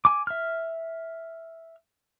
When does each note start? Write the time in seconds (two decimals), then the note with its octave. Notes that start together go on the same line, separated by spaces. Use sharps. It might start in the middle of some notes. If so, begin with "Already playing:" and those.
0.05 G#5 D6
0.27 E5 F6